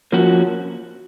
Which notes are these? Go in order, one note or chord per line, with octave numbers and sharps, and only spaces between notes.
F3 A#3 C#4 F#4